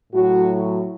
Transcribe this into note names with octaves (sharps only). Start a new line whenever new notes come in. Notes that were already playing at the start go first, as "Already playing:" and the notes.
A2 F#3 F#4